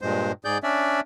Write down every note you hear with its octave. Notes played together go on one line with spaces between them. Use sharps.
G2 A#2 G#3 C5
G#2 G#4 D5 G6
C#4 D4 D5 E5